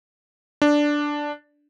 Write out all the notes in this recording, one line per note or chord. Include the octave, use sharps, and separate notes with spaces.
D4